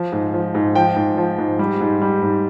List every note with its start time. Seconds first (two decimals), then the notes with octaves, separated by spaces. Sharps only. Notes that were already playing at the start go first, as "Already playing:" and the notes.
Already playing: F3
0.12 G#2
0.34 F3
0.55 G#2
0.75 F3 G5
0.96 G#2
1.17 F3
1.38 G#2
1.59 G3
1.81 G#2
2.02 G3
2.22 G#2